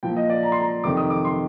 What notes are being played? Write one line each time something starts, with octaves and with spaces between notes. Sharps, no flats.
A#2 F3 G5
D#5
D5
A#5
C6
A#5
F2 C3 D#3 D6
D#6
D6
C6